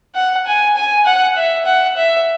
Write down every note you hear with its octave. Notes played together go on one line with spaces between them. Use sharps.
F#5
G#5
G#5
F#5
E5
F#5
E5